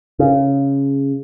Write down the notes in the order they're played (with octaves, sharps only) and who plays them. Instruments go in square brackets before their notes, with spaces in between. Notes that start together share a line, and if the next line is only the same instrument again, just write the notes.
[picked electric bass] C#3